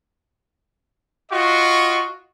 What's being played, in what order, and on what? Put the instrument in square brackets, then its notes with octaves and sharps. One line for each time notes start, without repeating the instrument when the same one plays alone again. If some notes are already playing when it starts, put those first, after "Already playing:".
[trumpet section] F4 F#4 D#5 C#6